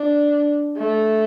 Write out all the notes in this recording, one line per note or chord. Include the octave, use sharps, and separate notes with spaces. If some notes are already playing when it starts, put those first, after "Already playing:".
Already playing: D4
A3